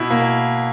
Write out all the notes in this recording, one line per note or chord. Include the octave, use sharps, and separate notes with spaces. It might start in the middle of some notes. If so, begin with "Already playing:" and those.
Already playing: B2 E4
A#3